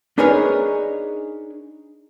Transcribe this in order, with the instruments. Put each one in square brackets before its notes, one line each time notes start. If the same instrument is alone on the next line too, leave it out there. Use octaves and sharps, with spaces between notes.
[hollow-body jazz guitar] D4 D#4 G#4 A#4 B4 C#5